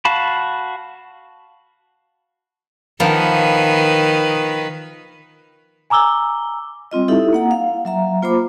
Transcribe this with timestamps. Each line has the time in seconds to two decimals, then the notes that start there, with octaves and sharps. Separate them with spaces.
0.05 F#4 F5 A5 B5
3.00 D#3 F3 A#3 B3 B4
5.90 G#5 A#5 D6 E6 G7
6.91 G3 C4 F4 D#5
7.08 D#4 E4 G4 A4 E5
7.33 A#3 F#5 A#5
7.51 F5
7.85 F#3 E5 A#5
8.22 A#3 F4 C5 B5 D6